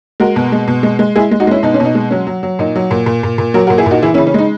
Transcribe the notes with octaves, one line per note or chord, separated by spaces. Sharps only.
G#3 F#4 A#4
B2
G#3
B2
G#3
G#3
G#3 E4 G#4
G#3
D#4 F#4
G#3 C#4 E4
B2 D#4
C#4
B2 D#4
G#3
F#3 C#4
F#3
F#3
A#2 D#4
F#3
A#2
A#2
A#2
A#2
F#3 F#4 A#4
F#4 A#4
A#2
E4 G#4
A#2 D#4 F#4
E3 E4 G#4
C#4 E4
C#3
C#4
G#3 D#4